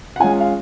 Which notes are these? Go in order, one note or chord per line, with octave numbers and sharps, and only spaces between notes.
F#5
G#3 C#4 F4 G#5
F5